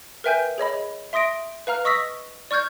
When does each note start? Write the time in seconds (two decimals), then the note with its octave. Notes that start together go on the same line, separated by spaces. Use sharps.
0.24 A#4 B4 E5 G5 G#5 G6
0.58 G#4 C#5 D#5 B5
1.13 E5 C6 D#6 A#6 D7
1.67 B4 F5 A#5 F6
1.85 D#5 C#6 D#6 E6 A#6 B6
2.51 D5 C#6 F6 G6 G#6